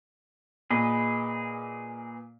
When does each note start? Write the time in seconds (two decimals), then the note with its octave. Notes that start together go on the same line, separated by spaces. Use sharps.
0.71 A#2 G#4 B4 D#5